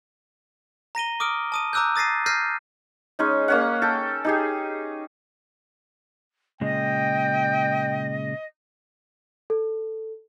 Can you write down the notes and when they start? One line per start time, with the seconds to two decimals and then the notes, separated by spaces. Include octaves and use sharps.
0.95 A#5 A#6 D#7 G7
1.20 D6 D#6 F6 D7
1.52 A5 D#6 D#7
1.73 A#5 D6 E6 F#6 G6
1.95 D#6 A6 A#6 C7 D#7
2.26 F6 G6 A#6 C7 D#7
3.19 G#3 C#4 D#4
3.48 A#3 C#4 F#5
3.82 A4 G5
4.25 D#4 G4 G#4
6.61 A#2 C#3 G#3 D#5 G5
9.50 A4